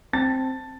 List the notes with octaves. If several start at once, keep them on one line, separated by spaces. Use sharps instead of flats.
C4 A5 A6